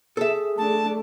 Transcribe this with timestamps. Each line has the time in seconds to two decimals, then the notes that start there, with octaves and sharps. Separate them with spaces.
0.17 G#4 A4 E5
0.57 A3 D4 A5